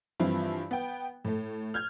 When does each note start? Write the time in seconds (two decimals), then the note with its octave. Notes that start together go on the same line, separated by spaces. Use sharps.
0.20 G2 E3 F3 C4 E4 F4
0.71 B3 G5
1.25 A2 A3
1.74 F6 G6 G#6